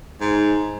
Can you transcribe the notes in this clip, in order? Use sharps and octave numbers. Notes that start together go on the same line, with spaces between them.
G#2